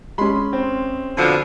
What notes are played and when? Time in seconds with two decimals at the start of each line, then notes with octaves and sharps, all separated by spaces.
0.18 G#3 C#4 B5 C6
0.53 C4
1.18 B2 D3 F3